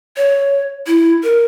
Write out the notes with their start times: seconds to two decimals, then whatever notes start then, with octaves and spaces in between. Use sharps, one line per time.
0.17 C#5
0.87 E4
1.23 A#4